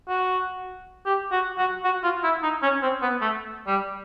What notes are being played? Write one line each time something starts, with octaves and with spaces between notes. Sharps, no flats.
F#4
G4
F#4
F#4
F#4
F4
E4
D#4
C#4
C4
B3
A3
G3